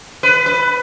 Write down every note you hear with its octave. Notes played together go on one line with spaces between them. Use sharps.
B4
B4